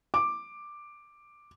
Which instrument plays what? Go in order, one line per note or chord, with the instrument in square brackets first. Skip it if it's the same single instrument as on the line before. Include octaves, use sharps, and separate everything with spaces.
[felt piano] D6